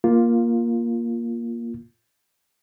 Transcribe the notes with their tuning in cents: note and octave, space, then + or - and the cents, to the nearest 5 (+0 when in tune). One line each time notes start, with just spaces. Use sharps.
A#3 +10 F4 +0